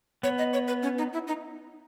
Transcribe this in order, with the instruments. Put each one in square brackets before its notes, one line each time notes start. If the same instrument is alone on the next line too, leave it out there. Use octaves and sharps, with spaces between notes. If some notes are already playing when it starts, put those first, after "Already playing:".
[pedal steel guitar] B3 [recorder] C#5
[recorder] D#5
C#5
B4
C#4
D#4
E4
D#4